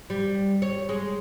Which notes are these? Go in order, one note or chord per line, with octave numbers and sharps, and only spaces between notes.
G3
C#5
G#3